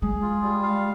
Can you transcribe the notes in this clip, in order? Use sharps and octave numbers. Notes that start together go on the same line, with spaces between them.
G#3 G#4
F4
G3
F5